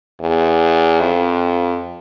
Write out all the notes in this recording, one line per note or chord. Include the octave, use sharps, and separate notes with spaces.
E2
F2